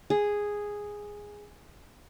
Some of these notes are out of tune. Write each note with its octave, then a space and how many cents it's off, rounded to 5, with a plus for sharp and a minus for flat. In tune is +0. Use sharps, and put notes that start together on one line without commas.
G#4 -5